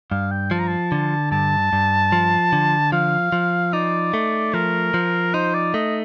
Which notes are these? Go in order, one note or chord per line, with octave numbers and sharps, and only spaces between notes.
G2 F5
G5
F3 A5
A#5
A5
D3
G2 A5
G2
F3
D3
F3 F5
F3
D#4 D5
A3
F3 A#4
F3
D#4 C5
D5
A3 D#5